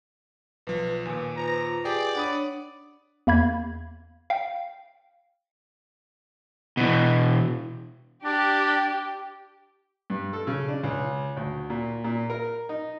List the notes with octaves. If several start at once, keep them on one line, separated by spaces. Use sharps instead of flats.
B1 F3 B4
D#2 A#2 G#5
F4 B4 C5 A#5
G4 G#4 D5 G5
D4 C#5 F#5 B5 D#6
E2 A#3 B5 G#6
F5 G5
B2 E3
D4 G4
G2
A4
C#3
D4
C#2
D2
A#2
A#2
A#4
D#4